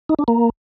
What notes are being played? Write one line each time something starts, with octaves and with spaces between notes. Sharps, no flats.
D#4
D4
A#3